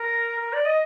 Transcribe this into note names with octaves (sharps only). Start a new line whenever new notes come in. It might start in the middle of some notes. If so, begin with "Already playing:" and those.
Already playing: A#4
A#4
D5
D#5